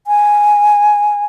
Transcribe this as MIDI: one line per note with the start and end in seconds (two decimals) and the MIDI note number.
0.07 1.25 80